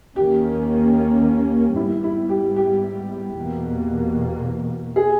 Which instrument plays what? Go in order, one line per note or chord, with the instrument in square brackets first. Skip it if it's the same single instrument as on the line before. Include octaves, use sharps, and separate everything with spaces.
[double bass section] D#2 D#3 A#3 C#4 [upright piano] G4
[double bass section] G#2 G3 B3 [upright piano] E4
[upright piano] E4
G4
G4
[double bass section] E2 B2 A#3
[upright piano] G#4